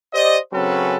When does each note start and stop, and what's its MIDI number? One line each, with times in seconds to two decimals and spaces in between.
0.14 0.38 67
0.14 0.38 72
0.14 0.38 74
0.14 0.38 75
0.53 0.97 49
0.53 0.97 54
0.53 0.97 60
0.53 0.97 61
0.53 0.97 69
0.53 0.97 71